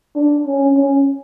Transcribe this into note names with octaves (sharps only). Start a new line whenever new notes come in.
D4
C#4
C#4